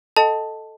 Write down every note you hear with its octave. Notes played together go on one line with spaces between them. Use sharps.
A4 D#5 G5 A5